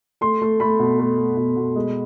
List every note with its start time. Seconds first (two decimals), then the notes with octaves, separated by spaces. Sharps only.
0.21 A3 C6
0.42 A3
0.60 A3 B5
0.79 B2
0.99 A3
1.18 A3
1.37 B2
1.57 B2
1.76 G#3